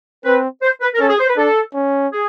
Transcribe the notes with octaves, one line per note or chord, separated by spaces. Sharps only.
C4 B4
C5
B4
A#4
C#4 A4
G#4
C5
B4
D4 A4
C#4
G#4